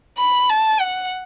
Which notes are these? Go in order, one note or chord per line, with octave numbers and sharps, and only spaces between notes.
B5
A5
F#5